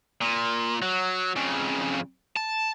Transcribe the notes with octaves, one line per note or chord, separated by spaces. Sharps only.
A#2
F#3
F2 C#3
A5